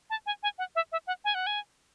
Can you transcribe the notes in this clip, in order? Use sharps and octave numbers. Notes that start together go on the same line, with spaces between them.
A5
G#5
G#5
F#5
E5
E5
F#5
G#5
F#5
G#5